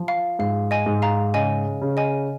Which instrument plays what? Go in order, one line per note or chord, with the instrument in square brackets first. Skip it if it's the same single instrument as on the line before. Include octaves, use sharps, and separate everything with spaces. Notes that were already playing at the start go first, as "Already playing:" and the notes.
Already playing: [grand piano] F3
[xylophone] F5
[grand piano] G#2 [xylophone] F5
[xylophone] D#5 G#5
[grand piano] G#2
[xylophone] F5 A#5
[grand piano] C#3 [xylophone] D#5 G#5
[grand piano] C#3
[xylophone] D#5 G#5